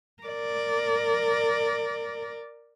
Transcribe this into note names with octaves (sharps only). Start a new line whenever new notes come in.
A#4 D5